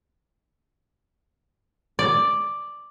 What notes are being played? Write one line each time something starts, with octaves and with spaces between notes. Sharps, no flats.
D5